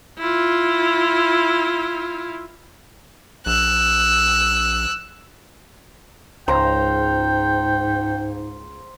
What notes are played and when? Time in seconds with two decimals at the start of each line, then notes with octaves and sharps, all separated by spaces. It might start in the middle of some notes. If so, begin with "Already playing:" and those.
0.18 E4 F4
3.46 A#1 E6 F#6
6.48 C#2 G#2 C5 F5 G5 A#5